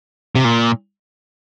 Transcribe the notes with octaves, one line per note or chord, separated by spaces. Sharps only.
C3
A#2